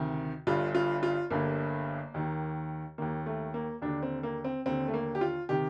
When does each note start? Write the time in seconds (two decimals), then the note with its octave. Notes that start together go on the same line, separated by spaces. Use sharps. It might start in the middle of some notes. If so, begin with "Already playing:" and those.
Already playing: D2 C3 D#3
0.47 G1 G2 D3 F4
0.75 F4
1.03 F4
1.30 G1 G2 D3 A#3
2.14 D#2 D#3
2.98 D#2 D#3 A#3
3.26 A3
3.54 A#3
3.82 D#2 D3 D4
4.02 C4
4.23 A#3
4.44 C4
4.66 D#2 D3 C4
4.88 A3
4.94 A#3
5.15 G4
5.21 F4
5.49 C3 D#3 G4